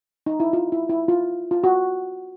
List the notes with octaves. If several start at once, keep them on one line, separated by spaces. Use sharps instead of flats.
D#4
E4
F4
E4
E4
F4
F4
F#4